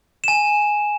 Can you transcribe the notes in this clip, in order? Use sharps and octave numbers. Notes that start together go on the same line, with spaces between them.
G#5 E7